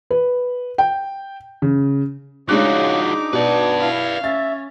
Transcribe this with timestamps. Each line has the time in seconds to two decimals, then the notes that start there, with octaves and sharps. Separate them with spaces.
0.11 B4
0.78 G5
1.62 C#3
2.49 C#3 F3 G#3 D4 D#4 F#4 D6 F#6
3.33 B2 B3 D4 B4 D5
3.80 E4 F5
4.24 C#4 E5 A6